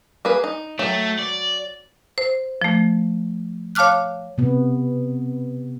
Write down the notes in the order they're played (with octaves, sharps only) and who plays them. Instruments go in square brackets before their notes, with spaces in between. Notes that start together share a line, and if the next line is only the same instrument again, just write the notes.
[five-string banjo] A#3 G#4 B4
D#4
[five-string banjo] F#3 G5 [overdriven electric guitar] A3
[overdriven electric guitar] D5
[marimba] C5
F3 A3
C#5 F5 A5 D6 F6 F#6
[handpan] C3 B3